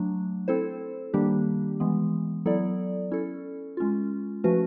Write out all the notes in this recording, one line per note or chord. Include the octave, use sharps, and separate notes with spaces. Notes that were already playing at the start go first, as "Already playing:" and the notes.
Already playing: F#3 A3 D4
C4 E4 A4 C5
D#3 G3 A#3 D4 G4
E3 G#3 B3
F#3 B3 E4 A4 D5
C#4 E4 A4
G#3 C#4 F4
F3 A3 C#4 F#4 B4